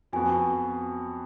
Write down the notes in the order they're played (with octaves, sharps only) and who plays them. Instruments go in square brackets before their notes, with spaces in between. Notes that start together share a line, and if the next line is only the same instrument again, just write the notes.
[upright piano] F2 F3 B3 F#4 [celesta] G#5